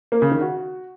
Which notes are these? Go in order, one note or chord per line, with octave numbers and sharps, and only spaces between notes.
A#3
C#3
D#3
F#4